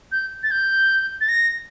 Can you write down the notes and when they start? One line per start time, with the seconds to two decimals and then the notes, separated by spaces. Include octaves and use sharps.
0.12 G6
0.43 A6
0.51 G6
1.21 A6
1.29 A#6